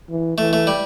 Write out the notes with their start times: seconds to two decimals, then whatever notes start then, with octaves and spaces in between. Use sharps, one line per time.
0.10 E3
0.38 E3 A3
0.53 A3
0.67 G3